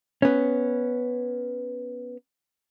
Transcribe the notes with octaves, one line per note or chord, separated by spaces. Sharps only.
B3 C#4